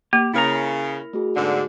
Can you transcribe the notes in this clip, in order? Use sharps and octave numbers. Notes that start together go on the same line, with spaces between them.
A#3 G4
C#3 E4 A#4 A#5 A6 B6 C#7
A3 F#4 G#4
G#2 B2 D3